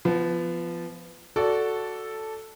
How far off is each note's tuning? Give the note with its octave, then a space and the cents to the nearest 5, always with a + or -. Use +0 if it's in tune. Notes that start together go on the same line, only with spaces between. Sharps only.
F3 -15 B3 +15
F#4 +0 A4 +0 D5 -15